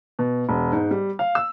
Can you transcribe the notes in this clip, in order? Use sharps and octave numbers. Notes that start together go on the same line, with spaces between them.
B2
E1
G#2
G3
F5
E6